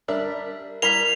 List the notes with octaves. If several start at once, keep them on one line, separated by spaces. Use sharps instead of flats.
G3 D4 A#4 E5
G3 E4 A#4 A#5 B6 C7 F7